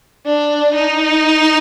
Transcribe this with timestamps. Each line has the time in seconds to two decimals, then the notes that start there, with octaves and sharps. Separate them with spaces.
0.26 D4
0.75 D#4